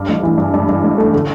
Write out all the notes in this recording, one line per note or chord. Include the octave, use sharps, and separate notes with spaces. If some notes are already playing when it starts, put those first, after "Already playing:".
Already playing: G2
A1
E3
G2
G2
G2
A1
A3
D3